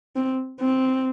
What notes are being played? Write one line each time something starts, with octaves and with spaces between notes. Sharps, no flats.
C4
C4